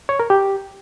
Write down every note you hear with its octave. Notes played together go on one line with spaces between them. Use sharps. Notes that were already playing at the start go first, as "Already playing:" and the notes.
C#5
A#4
G4